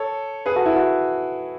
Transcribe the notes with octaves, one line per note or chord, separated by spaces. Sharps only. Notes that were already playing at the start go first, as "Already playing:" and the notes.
Already playing: A4 C#5
G#4 B4
F#4 A4
E4
F#4